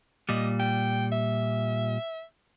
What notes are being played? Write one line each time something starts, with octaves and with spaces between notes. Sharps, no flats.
A#2 G3 D#5
G5
E5